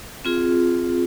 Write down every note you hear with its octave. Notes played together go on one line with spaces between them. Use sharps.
C4 F4 G#4